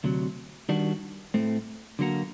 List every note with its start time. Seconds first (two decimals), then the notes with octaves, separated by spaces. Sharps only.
0.04 D2 C3 F#3
0.69 D#3 G3 D4 F#4
1.34 A2 A3 C4
1.99 D3 F#3 A#3 F#4 A#4